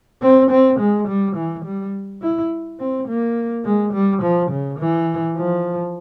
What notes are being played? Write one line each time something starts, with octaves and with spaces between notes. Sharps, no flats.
C4
C4
G#3
G3
E3
G3
E4
C4
A#3
G#3
G3
F3
C#3
E3
F3